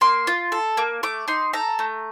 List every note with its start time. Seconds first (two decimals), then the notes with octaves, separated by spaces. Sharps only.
0.01 A#3 C6
0.27 F4
0.52 A4
0.77 A#3
1.03 A3 D6
1.28 D#4 C6
1.53 A4 A#5
1.79 A3